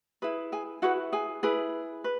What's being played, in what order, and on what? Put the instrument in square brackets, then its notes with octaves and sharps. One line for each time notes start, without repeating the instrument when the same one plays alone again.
[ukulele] E4 G#4 B4
G#4 G#5
E4 F#4 G#4 B4 F#5
G#4 G#5
E4 G#4 B4
B4